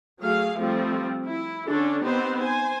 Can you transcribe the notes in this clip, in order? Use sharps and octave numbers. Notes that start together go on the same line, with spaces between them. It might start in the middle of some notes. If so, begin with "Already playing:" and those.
F#3 A3 G#4 F5
F3 G3 A3 C4
E4
D3 C#4 D4 A4
B3 C4 D#4 G4 C5
C5 G#5